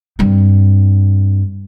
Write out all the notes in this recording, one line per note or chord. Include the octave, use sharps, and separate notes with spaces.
G2 C4